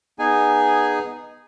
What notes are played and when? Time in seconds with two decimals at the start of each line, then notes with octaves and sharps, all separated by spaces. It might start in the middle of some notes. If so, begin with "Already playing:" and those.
0.19 B3 D#4 G#4 G#5